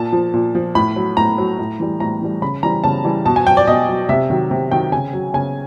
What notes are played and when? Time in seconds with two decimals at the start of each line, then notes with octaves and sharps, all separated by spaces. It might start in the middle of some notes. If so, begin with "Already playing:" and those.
Already playing: A#2 A5
0.13 F3
0.34 A#2
0.55 F3
0.75 A2 B5
0.96 F#3
1.17 A2 A#5
1.38 F#3
1.59 A2
1.80 E3 G3
2.00 A2 A#5
2.21 E3 G3
2.42 C#3 B5
2.63 E3 G3 A#5
2.84 C#3 A5
3.04 E3 G3
3.26 B2 A5
3.36 G#5
3.47 F#3 G5
3.57 D5
3.67 B2 D#5
3.88 F#3
4.09 C3 E5
4.30 D#3 F#3
4.51 C3
4.71 D#3 F#3 G5
4.92 C#3 G#5
5.13 F#3
5.34 C#3 G#5